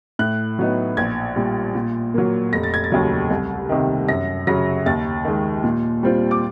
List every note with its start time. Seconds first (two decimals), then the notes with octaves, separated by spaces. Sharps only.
0.19 A2 F#6
0.59 F#3 B3 D#4
0.97 A#1 G#6
1.36 A#2 G3
1.75 A#2
2.14 F#3 A#3
2.53 F1 A#6
2.63 A6
2.74 G#6
2.84 A6
2.92 D#2 C#3 F#3
3.30 C2
3.69 C3 D#3
4.08 F#2 A#6
4.47 C#3 F#3 A#6
4.86 D#2 A6
5.25 D#3 G#3
5.64 A#2
6.03 G3 C4 F4
6.31 D6